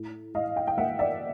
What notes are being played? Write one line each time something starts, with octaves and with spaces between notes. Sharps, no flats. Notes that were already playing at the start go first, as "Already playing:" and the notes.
Already playing: A2
A2 D#5 F5
F5 G5
G5
A#3 E5 F#5
D5 E5